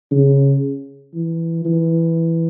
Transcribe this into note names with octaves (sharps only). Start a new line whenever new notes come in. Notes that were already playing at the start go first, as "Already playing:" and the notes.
C#3
E3
E3